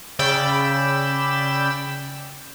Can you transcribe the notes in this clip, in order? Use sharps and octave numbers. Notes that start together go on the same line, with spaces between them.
C#3 D5 G5 B5 E6 E7